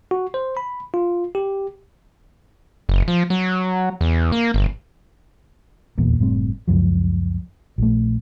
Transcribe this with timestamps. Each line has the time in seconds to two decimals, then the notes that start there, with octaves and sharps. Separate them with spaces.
0.11 F#4
0.34 C5
0.57 B5
0.94 F4
1.35 G4
2.89 F#1
3.08 F3
3.30 F#3
4.01 E2
4.32 A#3
4.54 G1
5.98 D#1 A#1 E2 A#3
6.19 F#1 A2 G3 C4
6.68 C#2 F#2 F3 F#3
7.78 A#1 A3